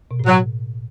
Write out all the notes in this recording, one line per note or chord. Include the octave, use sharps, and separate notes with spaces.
B2
A2
F#3